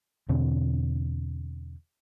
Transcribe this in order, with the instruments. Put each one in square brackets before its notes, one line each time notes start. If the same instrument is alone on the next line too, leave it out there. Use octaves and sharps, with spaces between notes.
[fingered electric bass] E2 B2 D3 C4